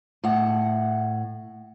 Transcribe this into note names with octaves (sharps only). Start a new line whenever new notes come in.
A2 F#5